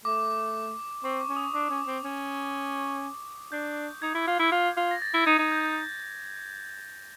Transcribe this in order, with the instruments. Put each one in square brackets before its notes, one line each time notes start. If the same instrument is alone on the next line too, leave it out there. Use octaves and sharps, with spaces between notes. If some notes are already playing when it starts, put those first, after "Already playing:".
[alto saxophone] A3 [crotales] D6
[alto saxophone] C4 [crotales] C#6
[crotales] D6
[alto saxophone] C#4
[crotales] D#6
[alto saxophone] D4 [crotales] D6
[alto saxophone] C#4
C4
C#4
[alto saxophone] D4 [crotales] G6
[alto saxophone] D#4 [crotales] G#6
[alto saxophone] E4
F4
E4
F4
F4
[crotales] A#6
A6
[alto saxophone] E4
[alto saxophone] D#4 [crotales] G#6
[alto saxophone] D#4
[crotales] G6